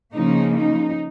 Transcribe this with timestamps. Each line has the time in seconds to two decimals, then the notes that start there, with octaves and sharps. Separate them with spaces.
0.13 C#3 F3 A#3 D#4
0.55 D#4